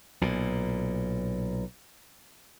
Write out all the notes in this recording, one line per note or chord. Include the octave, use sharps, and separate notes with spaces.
B1 A#2